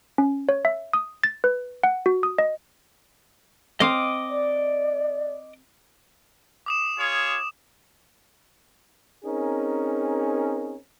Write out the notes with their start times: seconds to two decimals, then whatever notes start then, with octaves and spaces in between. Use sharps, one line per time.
0.18 C#4
0.49 C#5
0.65 E5
0.93 D#6
1.24 A6
1.44 B4
1.83 F#5
2.06 F#4
2.23 D#6
2.38 D#5
3.80 C4 D#5 F5 D6 D#6
4.29 D5
6.66 D6 D#6 E7
6.99 F4 G#4 C#5
9.25 C4 C#4 D#4 G#4 A#4